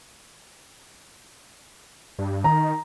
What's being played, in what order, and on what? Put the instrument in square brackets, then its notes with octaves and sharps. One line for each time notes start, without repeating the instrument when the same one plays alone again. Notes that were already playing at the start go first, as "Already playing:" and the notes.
[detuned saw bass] G2
[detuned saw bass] D#3 [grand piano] A#5